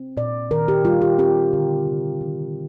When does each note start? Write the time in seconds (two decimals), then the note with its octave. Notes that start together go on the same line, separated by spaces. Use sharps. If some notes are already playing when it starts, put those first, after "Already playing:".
Already playing: C4
0.17 A#2 D5
0.51 D#3 A#4
0.68 G4
0.85 G3 F4
1.02 G4
1.18 C4 G4
1.53 D3
1.86 C3
2.21 D#3